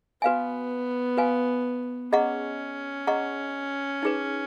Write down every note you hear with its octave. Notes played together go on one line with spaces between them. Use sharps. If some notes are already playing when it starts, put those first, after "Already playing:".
B3 F#4 B4 F5 G#5
F#4 B4 F5 G#5
C#4 G#4 D#5 F#5 A#5 C#6
G#4 D#5 F#5 A#5 C#6
D#4 G#4 B4